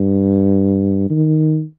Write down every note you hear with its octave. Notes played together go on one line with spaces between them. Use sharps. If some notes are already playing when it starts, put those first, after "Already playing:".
Already playing: G2
D#3